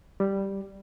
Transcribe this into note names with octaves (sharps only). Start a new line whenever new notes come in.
G3